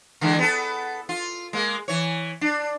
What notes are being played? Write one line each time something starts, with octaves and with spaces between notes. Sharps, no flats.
D3 E3 G#3
B3 A4
F4
G#3 A#3
E3 C#5
D4